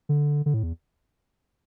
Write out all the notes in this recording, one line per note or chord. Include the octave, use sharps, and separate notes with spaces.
D3
D3
A2
E2